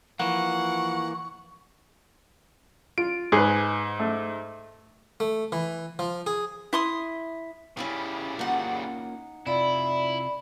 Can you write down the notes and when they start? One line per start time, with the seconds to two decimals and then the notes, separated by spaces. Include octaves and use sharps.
0.20 E3 F3 A#3 F#5 C#6
2.98 F4 D7
3.32 G#2 G#4 B4
4.00 A3
5.20 A3
5.52 E3
5.99 F3
6.27 G#4
6.73 E4 C6 D#6
7.77 C#3 G3 C#4 E4 F5
8.39 A#3 C#4 D#4 F4 F#5
9.46 C3 E4 F4 D5 B5